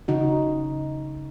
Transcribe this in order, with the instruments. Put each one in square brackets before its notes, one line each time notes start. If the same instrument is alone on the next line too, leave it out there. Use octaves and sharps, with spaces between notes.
[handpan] C#3 D#4 F#4